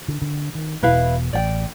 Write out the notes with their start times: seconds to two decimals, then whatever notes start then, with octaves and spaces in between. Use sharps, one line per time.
0.08 D3
0.22 D3
0.55 D#3
0.83 E1 B2 E4 B4 F5
1.33 A1 D5 G5